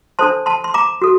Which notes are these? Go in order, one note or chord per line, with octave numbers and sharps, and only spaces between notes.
D4 A4 C5 A5 C6
A5 C6
C6
A#5 D6
F#4 A4